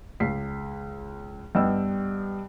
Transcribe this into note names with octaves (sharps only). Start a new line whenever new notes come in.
C#2 B6 C7
G2 B3 D#5 G5 E6